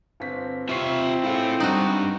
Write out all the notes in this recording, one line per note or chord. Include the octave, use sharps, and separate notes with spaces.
G1 C4 B6
C3 C4 F4 E5 C#6 C7
G#3 E4 F4 G#4 A4
G3 D4 D#4 F#4